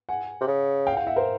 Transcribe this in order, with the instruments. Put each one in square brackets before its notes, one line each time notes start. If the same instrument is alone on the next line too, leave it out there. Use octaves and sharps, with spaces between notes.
[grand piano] F#5 G#5
[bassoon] C3
C#3
[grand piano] F5 G5
F#5
F5 G5
E5 F#5
A#4 C5